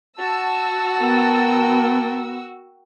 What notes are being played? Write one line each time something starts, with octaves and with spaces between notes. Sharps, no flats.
F#4 A5 E6
B3 A#4 G5